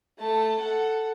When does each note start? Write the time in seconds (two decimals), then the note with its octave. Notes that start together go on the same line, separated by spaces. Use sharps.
0.19 A3 A5
0.59 A4 F#5